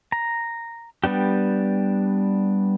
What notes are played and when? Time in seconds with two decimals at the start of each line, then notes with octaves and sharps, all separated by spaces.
0.12 A#5
1.04 G3 B3 D4 G4